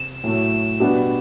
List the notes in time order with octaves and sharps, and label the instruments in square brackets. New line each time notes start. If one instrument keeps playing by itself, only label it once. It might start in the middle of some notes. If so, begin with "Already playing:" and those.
Already playing: [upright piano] C3 [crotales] E7
[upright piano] A2 F#3 A3
B2 G3 B3 D4